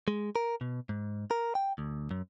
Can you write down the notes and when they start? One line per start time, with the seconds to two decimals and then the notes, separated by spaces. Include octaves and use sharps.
0.08 G#3
0.36 A#4
0.61 B2
0.89 G#2
1.31 A#4
1.55 G5
1.78 D2
2.11 F#2